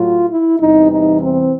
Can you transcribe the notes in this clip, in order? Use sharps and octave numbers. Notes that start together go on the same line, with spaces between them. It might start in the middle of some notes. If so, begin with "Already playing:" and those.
Already playing: A2 F#3 F4
E4
E2 C3 E3 G3 D#4
D#4
C4